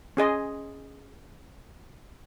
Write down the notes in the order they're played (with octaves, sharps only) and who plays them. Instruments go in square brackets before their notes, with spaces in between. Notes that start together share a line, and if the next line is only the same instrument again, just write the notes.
[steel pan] C#4 G#4 D#5 C6